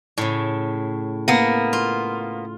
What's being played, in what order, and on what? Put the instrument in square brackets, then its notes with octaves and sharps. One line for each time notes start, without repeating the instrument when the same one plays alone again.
[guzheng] A2 C#3
[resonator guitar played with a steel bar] A#3 B3
[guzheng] F4